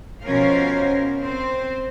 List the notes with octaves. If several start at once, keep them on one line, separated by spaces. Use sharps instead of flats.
B2 F3 C#4 A#4 C5 F5
C4 C5